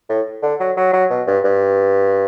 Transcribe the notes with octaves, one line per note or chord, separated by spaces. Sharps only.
A2
D3
F#3
F#3
F#3
B2
G2
G2